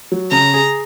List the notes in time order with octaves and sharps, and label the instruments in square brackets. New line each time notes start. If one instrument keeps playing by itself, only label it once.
[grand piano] F#3
[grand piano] C#3 [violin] A#5
[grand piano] G#4